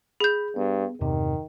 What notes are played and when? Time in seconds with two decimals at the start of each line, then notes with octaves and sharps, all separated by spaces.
0.20 G#4 B5 G6
0.56 G2 B3
1.01 E2 G2 C3 D#3